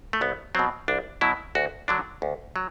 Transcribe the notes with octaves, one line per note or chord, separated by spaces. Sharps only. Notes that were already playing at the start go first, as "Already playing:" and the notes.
A3
C2 B3
B2 F#3 C4
C2 D4
B2 F#3 E4
D2 F#4
D3 F#3 D4
D2
F#3